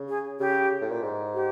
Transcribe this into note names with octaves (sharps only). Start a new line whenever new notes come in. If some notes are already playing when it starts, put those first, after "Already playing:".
Already playing: C#3
G#4
C#3 G4
A2
A#2
G#2
G4